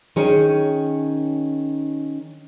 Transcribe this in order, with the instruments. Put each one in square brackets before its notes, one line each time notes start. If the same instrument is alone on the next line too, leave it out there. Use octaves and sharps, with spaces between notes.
[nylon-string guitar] D#3 C#4 D#4 G#4 C#5